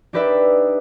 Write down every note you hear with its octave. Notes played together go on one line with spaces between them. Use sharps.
D4 D#4 G4 B4 D5 E5